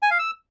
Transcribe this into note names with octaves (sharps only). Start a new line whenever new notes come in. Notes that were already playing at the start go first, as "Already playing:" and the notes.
G#5
F5
E6